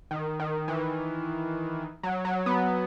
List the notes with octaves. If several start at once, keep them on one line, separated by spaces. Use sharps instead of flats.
D#3
D#3
E3
F#3
F#3
B3